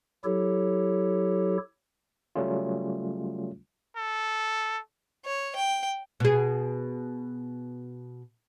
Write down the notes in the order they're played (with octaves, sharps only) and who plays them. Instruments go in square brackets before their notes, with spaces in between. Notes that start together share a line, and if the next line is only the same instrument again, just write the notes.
[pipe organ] F#3 E4 G4 A4 C#5
[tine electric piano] C#3 F#3 G3 A3 C#4 F4
[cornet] A4
[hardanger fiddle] C#5
G5
[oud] B2 G#4